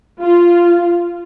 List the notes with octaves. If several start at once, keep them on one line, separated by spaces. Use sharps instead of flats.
F4